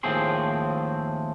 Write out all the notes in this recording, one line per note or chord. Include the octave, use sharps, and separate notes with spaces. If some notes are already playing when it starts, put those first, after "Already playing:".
D#2 A2 F3 C4 G#4 C6